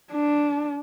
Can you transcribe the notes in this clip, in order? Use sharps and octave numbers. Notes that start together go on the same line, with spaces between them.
D4